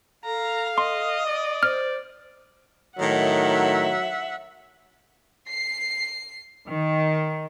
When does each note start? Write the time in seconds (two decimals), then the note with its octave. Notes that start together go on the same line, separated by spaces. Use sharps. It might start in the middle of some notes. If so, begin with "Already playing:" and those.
0.25 A4 F5 A#5
0.78 D#5 C6
1.26 D5
1.63 C5 F6
2.98 A2 D#3 F#3 E5 F#5
5.48 C7
6.68 D#3